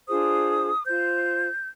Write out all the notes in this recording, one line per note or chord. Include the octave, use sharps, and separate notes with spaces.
D4 F4 G#4 C5 D#6
F4 C5 G6